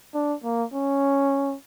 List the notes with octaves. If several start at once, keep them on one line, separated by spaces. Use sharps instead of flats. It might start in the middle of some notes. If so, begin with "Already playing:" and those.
D4
A#3
C#4